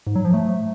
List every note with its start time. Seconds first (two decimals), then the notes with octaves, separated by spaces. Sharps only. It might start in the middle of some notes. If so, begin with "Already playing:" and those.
0.07 G#2
0.16 F#3
0.25 F3
0.34 A3